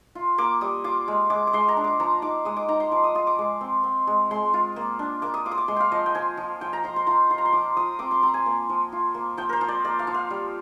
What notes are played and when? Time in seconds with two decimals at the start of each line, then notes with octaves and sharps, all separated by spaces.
0.15 F4
0.38 A#3 D6
0.61 G3 D#6
0.84 F4 D6
1.08 G#3
1.30 G#3 D6
1.47 D6
1.53 G#3 C6
1.69 A#5
1.77 D4
1.84 D6
2.00 F3 A#5
2.22 D#4 D6
2.45 G#3 D#6
2.56 D6
2.68 D#4 A#5
2.80 C6
2.92 F3 D6
3.04 D#6
3.15 F4 D#6
3.27 D6
3.38 G#3
3.61 C4
3.84 C4
4.07 G#3
4.31 G#3 C6
4.54 F4
4.76 A#3
4.99 D4
5.22 A#3 D6
5.34 D#6
5.46 F4 D6
5.52 D#6
5.58 D6
5.68 G#3 C6
5.76 F5 G5
5.92 F3 D#5
6.06 G5
6.15 F3 G#5
6.37 F3
6.61 F3 G5
6.73 A#5
6.84 F3 C6
6.96 C6
7.07 F4 A#5
7.30 F4 C6
7.38 A#5
7.45 C6
7.53 F3 D6
7.77 F3 D#6
7.99 C4 D6
8.11 C6
8.22 C4 A#5
8.34 G#5
8.46 A#3
8.69 F3
8.92 F4
9.14 A#3
9.37 F3 G5
9.49 A#4 C5
9.61 F3
9.68 D5
9.84 A#3 D5
9.99 F5
10.07 F3
10.14 F5
10.30 G3